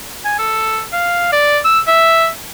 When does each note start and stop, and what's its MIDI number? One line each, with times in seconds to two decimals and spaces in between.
0.25 0.37 80
0.39 0.82 69
0.93 1.31 77
1.32 1.59 74
1.65 1.80 88
1.87 2.29 76